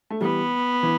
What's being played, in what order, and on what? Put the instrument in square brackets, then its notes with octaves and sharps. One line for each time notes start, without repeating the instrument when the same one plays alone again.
[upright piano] A3
[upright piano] E3 G3 [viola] B3
[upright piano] E3